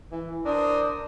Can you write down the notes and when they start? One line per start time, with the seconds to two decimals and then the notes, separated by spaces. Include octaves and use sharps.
0.12 E3
0.45 D4 A#4 C5 D#6